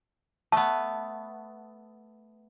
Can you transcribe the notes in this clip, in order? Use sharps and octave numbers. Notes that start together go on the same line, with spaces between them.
A3 B3 A5